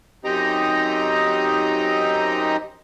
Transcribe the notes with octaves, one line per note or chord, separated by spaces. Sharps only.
F#2 C4 D#4 G4 D#5 A#5